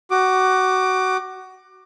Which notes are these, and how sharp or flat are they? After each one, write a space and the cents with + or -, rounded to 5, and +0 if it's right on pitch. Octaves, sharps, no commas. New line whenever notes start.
F#4 +20 D6 +20